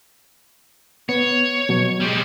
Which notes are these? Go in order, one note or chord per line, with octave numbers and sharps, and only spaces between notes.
B3 C#5
B2 F#3
G3 G#3